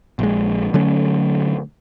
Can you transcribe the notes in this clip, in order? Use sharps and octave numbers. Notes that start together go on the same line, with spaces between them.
A#1 G#3
D3 F#3 A3 C#4